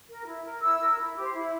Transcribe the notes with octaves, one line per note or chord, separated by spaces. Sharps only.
A#4
E4
A#4
E4 E6
A#4
E4
G4 C5
E4